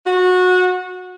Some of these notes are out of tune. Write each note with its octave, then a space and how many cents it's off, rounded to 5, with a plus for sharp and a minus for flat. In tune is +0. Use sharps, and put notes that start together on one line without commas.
F#4 -20